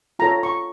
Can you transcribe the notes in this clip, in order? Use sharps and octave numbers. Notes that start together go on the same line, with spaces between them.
F4 A4 C#5 A#5
C#6